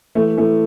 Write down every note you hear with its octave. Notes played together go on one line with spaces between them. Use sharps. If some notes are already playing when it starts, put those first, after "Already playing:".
E3 A3
E3 A3